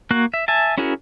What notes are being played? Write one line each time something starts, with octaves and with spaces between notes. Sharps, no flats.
A#3 F#4 F#6
E5
E5 G#5 A5
C#4 E4 F#4 G#4 A#4